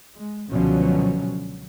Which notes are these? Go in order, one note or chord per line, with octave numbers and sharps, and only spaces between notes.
G#3
C#2 B2 D3 F3 F#3 C#4